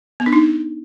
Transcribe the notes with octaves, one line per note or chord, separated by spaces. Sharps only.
B3
D4
D#4